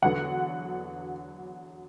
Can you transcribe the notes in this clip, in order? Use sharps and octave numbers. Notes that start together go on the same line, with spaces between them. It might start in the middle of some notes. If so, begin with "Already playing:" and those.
E2 D3 F#3 B3 F#5